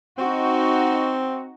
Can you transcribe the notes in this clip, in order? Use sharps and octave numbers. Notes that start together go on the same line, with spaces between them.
C4 D#4 F#4